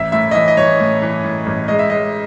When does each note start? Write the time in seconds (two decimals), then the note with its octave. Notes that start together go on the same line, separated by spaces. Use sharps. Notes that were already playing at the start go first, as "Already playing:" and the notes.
Already playing: A1 E5
0.12 A2 E5
0.31 D#5
0.35 E3 E5
0.48 D#5
0.57 E3 C#5
0.80 A2
1.02 E3
1.24 A2
1.46 A1
1.68 G#3 D#5
1.79 E5
1.90 G#3 D#5